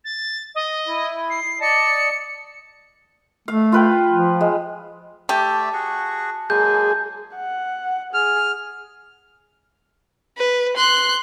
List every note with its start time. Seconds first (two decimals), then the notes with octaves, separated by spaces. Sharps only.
0.04 A6
0.54 D#5
0.87 E4
1.30 C7
1.61 D5 D#5 A5 C#7
3.48 A3 F5
3.72 F4 B4 G5
4.10 F3
4.41 G#3
5.29 A3 G4 D5 E5 A5
5.73 F#4 G#4 C#6
6.50 F#3 G#3 A#3 G#4 G6
7.35 F#5
8.14 G#4 F6
10.38 B4
10.76 C6 F#6